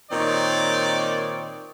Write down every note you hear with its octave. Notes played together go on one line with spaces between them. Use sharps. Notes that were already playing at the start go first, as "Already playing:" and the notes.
A#2 D#3 C4 D#4 C#5 D5